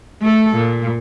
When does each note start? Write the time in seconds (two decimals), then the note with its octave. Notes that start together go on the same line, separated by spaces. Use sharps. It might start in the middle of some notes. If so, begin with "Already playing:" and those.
0.22 A3 A4
0.56 A#2